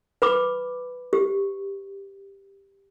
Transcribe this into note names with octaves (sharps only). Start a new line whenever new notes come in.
B4 B5 D6
G4